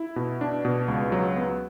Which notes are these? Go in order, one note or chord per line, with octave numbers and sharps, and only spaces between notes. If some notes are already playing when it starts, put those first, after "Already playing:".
Already playing: E4
B2
D4
B2
C#2
F#3
B3